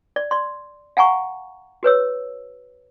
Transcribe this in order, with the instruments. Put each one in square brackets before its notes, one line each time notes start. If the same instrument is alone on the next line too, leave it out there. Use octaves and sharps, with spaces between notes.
[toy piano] D5
D5 C6
F5 F#5 G#5 A#5 C#6
F#4 B4 C#5 E6